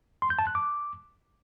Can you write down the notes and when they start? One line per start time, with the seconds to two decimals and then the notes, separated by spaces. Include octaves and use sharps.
0.22 C6
0.30 G6
0.39 A5
0.47 F#6
0.55 D6